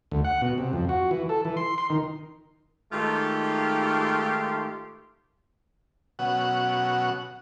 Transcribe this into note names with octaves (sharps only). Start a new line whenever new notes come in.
D2
F#5
B2
C3
F2
F#4
E3
A4
E3
C6
C6
D#3
G#2 D#3 A3 F4 G4 C6
B2 F#3 C#4 F#4 F#5